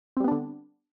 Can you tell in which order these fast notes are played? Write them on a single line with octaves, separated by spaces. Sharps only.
C4 G3 B3 D4 D3